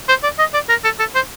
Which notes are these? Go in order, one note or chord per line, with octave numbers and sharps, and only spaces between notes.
C5
D5
D#5
D5
A#4
A4
A4
C5